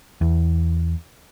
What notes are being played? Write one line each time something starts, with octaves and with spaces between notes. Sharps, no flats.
E2